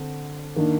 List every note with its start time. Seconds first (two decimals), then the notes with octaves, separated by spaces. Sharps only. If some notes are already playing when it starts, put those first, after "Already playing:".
Already playing: D3 C4
0.56 D#3 A#3 D4